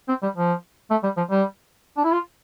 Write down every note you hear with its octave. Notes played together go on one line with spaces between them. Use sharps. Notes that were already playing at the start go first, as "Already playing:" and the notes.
C4
G3
F3
A3
G3
F3
G3
D4
E4
F4